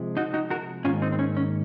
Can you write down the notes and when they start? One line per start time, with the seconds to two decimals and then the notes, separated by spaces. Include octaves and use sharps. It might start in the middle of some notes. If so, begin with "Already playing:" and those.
Already playing: C3 F3 G#3
0.17 D#4 F#4
0.34 D#4 F#4
0.50 F#4 A#4
0.84 G#2 D#3 A#3 C#4 F4
1.02 C4 D#4
1.12 C4
1.19 C#4
1.37 C#4